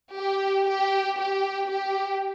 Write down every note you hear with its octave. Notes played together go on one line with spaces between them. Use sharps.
G4
G4
G4
G4